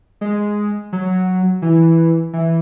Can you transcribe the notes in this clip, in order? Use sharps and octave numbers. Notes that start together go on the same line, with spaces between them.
G#3
F#3
E3
E3